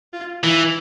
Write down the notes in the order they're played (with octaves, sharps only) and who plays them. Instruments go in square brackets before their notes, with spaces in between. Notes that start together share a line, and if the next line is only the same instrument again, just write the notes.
[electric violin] F4
[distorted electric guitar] E3 [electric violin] E4